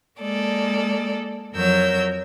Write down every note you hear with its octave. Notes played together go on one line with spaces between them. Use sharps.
G#3 A#3 A4 D5
F2 F#3 A#4 C#5 E6 G6